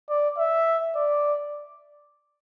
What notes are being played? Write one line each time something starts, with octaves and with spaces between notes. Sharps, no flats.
D5
E5
D5